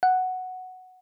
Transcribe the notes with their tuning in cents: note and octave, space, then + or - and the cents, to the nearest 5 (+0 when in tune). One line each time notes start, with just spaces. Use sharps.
F#5 +0